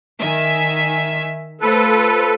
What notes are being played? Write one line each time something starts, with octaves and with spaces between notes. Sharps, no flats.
D#3 E5 G#5
A3 F4 A4 B4 C5